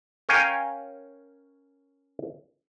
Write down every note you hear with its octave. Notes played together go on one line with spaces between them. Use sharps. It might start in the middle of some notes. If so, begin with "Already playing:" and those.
C#4 A#4 C#5 F5 G5 G#5